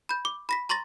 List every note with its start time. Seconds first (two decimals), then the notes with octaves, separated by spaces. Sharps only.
0.09 B5 G6
0.25 D6
0.49 B5 A#6 B6
0.69 A#5 C6 C#6 A6 A#6